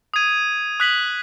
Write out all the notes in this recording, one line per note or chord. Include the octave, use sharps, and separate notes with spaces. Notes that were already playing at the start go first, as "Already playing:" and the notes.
D#6 G#6 D#7
D#6 F#6 B6 F#7